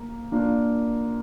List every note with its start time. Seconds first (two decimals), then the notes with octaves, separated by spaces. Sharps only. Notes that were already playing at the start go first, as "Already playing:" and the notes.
Already playing: A#3
0.32 A#3 D4 F4 A#4